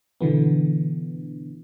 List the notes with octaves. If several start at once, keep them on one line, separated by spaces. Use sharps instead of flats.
B2 D3 E3 B3